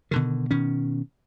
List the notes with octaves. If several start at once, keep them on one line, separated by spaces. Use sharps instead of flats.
B2 D3 D#3
B2 D#3 C#4